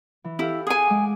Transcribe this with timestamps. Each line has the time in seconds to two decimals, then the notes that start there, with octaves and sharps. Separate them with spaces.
0.24 E3
0.39 E4 G4 A4 F5
0.67 G#4 F#5 G#5 D6
0.88 G#3 D6